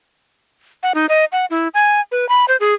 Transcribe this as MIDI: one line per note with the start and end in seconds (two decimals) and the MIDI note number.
0.83 0.92 78
0.94 1.06 63
1.09 1.25 75
1.32 1.45 78
1.50 1.68 64
1.74 2.00 80
2.12 2.28 71
2.29 2.45 83
2.48 2.56 72
2.60 2.74 68